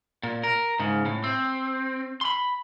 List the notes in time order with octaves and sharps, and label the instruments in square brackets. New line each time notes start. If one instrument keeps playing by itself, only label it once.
[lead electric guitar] A#2
A#4
G#2 C#3
A2
C4
B5 C6